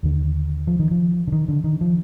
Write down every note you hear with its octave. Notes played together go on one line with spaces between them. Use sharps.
D#2 D3
F3
D#3
F3
D3
D#3
D3
D#3
F3